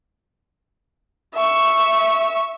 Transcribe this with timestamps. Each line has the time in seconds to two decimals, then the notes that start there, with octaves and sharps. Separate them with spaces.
1.35 E5 C#6